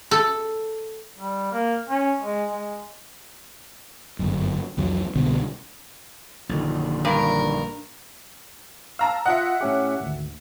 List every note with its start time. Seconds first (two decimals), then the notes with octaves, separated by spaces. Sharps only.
0.11 A4
1.18 G3
1.52 A#3
1.89 C#4
2.21 G#3
2.51 G#3
4.19 G1 F#2
4.77 C2 F2 E3 F#3
5.16 C2 B2 D3
6.49 A#1 F#2 D3 D#3
7.05 G2 A#4
8.99 F5 A5 A#5 E6
9.26 F4 D#5 E5 F#5
9.61 A2 C#4 G4
10.00 G#1 D2